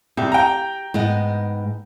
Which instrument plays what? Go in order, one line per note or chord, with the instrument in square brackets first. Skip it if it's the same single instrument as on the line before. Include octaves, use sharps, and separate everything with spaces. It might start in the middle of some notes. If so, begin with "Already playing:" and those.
[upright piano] C2 [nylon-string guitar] G4
[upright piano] G5 A#5
[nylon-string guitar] G#2 B3 D#5